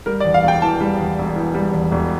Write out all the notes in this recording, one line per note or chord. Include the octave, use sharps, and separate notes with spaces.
G3 A#4
D5
E2
F5
E1 G5
E3 A5
G3
E2
E1
E3
G3
E2
E1